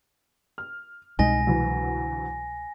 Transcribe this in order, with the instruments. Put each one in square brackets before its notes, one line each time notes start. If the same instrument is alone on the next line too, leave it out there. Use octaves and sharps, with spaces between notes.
[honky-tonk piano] F6
[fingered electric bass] C2 B2 G#3 [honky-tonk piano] D#4 [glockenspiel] G#5 A#6
[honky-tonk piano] D2 E3 F#3